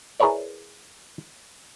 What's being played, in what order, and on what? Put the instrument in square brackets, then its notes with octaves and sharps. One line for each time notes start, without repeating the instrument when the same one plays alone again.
[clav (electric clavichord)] E4 G#4 A#4 B4 C#5 D5